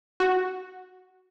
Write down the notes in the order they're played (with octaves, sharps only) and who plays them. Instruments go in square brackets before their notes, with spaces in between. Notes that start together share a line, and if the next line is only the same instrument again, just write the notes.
[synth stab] F#4